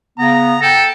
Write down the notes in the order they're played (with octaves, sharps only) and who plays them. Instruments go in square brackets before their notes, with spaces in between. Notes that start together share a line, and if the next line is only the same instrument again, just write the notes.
[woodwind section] C#3 B3 [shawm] A#5
[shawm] A4 [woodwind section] G5